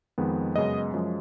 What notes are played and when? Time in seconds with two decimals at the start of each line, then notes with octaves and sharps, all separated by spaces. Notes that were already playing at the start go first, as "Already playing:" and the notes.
0.18 F2 D#3 G#3 B3
0.56 F#2 C#3 G#3 B3 D#5
0.93 F#2 F3 G#3